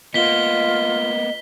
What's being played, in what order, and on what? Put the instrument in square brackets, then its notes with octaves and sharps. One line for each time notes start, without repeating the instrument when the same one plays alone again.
[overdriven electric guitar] A#3 B3 [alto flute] F4 [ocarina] D#5 [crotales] B6 G7